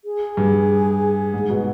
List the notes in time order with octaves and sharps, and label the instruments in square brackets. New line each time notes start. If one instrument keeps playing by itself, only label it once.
[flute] G#4
[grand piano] G2
G#2
B2